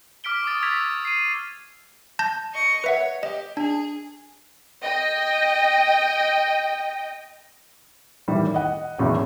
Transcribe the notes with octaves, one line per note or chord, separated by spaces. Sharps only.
D6 F6 B6 D7 G7
C#6 D#6 A6
E6 F6 G#6 A6 B6 F7
C7 D#7
A5 G6 A#6
D#5 C#6
B4 C#5 E5 F#5
G4 D#5
D4 G#4
D#5 G5
A2 D#3 E3 G3
D#5 F#5
G#1 E2 A2 F#3